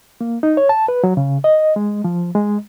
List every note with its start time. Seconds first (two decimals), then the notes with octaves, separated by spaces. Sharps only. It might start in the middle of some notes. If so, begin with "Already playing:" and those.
0.21 A#3
0.43 D#4
0.57 C#5
0.69 A5
0.88 B4
1.04 F#3
1.17 C#3
1.44 D#5
1.76 G#3
2.04 F3
2.35 G#3